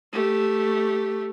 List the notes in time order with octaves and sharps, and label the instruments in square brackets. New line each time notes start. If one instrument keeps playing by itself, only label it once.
[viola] A3 G4